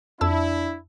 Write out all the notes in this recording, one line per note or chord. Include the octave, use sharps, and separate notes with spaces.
F2 D4 E4 A5 E6